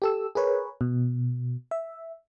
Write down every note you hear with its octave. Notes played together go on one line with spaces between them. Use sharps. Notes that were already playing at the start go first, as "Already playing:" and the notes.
G4 A4 E6
G#4 A#4 B4 C#5
B2
E5